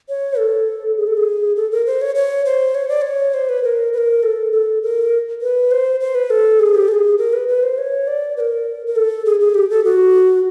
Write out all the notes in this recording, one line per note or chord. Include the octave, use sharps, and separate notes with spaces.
C#5
A4
G#4
A4
G#4
A4
A#4
C5
C#5
C#5
C5
C#5
D5
C#5
C5
B4
A#4
B4
A#4
A4
A4
A#4
B4
C5
C5
B4
A4
G#4
G4
A4
G#4
A#4
B4
B4
C5
C#5
D5
B4
A#4
A#4
A4
G#4
G#4
G4
A4
F#4